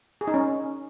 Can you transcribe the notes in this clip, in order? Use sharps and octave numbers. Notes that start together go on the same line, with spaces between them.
G#4
D#4
C#4